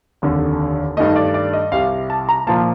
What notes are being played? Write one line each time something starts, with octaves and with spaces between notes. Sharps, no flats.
F1 D#2 D3
G2 D#3 A3 D#5
D5
D5
D#5
C2 C3 G3 F5
A5
A#5
A#2 F3 A#3 A5